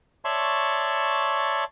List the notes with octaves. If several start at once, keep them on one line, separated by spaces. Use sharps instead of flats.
C#5 D5 E5 A5 C6 C#6